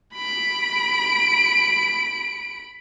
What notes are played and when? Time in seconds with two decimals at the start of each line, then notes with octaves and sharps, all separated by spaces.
0.14 B5 D7